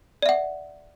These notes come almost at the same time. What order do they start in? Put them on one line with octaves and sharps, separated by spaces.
D5 E5 F#5